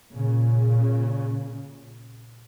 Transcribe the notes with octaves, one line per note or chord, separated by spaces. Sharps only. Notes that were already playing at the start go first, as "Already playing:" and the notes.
A#2 C#3